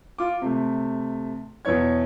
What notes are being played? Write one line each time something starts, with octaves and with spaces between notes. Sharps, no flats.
F4 D6
C3 A3
E2 B2 E3 C#5 G#6